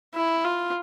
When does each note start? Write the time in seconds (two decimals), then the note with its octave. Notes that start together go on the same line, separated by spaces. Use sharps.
0.15 E4
0.44 F4